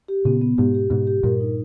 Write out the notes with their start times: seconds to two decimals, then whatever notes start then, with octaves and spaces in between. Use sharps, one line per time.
0.08 G4
0.25 A#2 C#3 B3
0.41 B3
0.58 G#2 B2 G4
0.75 G4
0.90 G#2 B2 G4
1.07 G4
1.23 G2 A#2 A#4
1.40 D#4